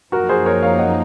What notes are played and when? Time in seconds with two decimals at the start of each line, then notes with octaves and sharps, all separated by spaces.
0.12 F#2 F3 A#3 D#4 F#4 A#4
0.29 G#4 C5
0.46 A#4 C#5
0.63 C#5 F5
0.79 D#5 F#5